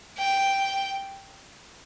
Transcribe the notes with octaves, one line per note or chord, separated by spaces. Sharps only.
G5